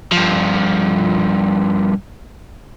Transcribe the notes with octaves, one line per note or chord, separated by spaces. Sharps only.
G2 F3